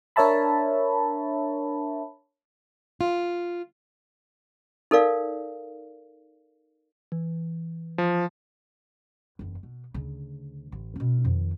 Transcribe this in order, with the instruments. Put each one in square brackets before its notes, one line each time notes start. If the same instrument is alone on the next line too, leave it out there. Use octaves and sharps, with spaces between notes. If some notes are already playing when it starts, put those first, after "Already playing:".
[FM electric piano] D4 A#4 C#5 E5 A5 B5
[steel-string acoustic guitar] F4
[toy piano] D#4 A4 A#4 D5 F5
[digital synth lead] E3
[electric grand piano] F3
[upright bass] F#1 E2
B2
D2 C#3
A1
B2 C#4
F2 D#3